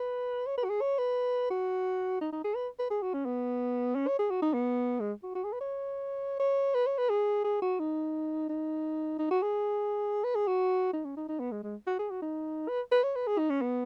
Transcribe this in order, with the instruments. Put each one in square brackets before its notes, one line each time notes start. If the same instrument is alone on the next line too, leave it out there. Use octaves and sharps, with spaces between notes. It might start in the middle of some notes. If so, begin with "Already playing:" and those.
Already playing: [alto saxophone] B4
C#5
B4
F#4
G#4
C#5
B4
F#4
D#4
D#4
G#4
B4
B4
G#4
F#4
C#4
B3
C#4
C#5
G#4
F#4
D#4
B3
G#3
F#4
F#4
G#4
B4
C#5
C#5
B4
C#5
B4
G#4
G#4
F#4
D#4
D#4
D#4
F#4
G#4
B4
G#4
F#4
D#4
C#4
D#4
D#4
B3
G#3
G#3
F#4
G#4
F#4
D#4
B4
B4
C#5
B4
G#4
D#4
C#4
B3